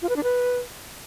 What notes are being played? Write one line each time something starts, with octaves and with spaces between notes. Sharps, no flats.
F4
B4
D4
B4